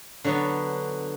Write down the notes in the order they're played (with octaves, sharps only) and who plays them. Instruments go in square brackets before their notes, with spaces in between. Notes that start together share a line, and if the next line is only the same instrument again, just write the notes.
[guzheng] D3 F#3 B3